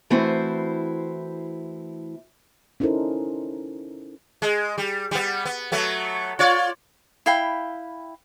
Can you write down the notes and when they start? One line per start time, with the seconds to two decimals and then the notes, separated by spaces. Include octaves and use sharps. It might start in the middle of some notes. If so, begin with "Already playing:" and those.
0.10 E3 A3 C4 E4 F#4 C5
2.80 C#4 D#4 E4 A4 A#4 C5
4.42 G#3
4.78 G3
5.11 G3 B3
5.45 B3
5.72 F#3 A3 B3
6.39 F4 C#5 D5
7.26 E4 F5 G5 B5